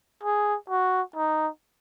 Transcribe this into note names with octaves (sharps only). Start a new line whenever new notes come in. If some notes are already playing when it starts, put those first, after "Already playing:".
G#4
F#4
D#4